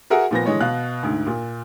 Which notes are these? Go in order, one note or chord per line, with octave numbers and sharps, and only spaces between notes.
F#4 G#4 A#4 E5 F#5 G#5
A#2 F3 B3 A#6
D3 E3 G#3 C#5
B2 F5 F#6
D2 G#2
A#2